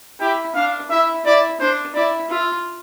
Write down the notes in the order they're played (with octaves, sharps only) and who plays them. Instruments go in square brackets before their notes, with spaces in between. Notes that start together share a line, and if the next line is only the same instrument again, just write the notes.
[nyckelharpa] E4 [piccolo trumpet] G4
[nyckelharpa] D4 [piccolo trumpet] F5
[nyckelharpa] E4 [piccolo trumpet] E5
[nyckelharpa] E4 [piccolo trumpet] D5
[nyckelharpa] D4 [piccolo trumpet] C5
[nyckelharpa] E4 [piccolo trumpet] D5
[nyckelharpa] F4 [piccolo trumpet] E5